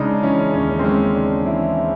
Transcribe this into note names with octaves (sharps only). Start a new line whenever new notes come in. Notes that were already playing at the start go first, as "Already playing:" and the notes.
Already playing: C#3 G#3 D4 D#4
E3 C#4
D#2 C#4
C4
G#3 C#4
C#3 D4
E3 E4